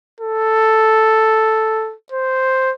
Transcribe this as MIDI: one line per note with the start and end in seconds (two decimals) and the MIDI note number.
0.21 1.95 69
2.12 2.72 72